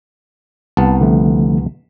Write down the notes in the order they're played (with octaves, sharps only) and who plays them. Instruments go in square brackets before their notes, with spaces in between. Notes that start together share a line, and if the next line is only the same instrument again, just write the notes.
[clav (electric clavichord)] C2 B3 [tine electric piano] A5
[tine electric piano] D3 F3 A3